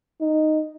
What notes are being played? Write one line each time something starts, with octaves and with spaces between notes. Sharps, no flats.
D#4